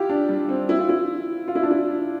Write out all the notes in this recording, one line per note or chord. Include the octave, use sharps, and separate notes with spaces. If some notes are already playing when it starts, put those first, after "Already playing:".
Already playing: E4 F4 G4
D4
G3
C4
E4
F4
E4
F4
E4
D4
E4